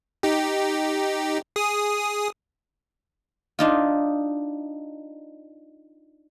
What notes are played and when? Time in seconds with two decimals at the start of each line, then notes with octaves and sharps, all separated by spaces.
0.23 D#4 G4
1.56 G#4 D#6
3.59 D4 D#4 F4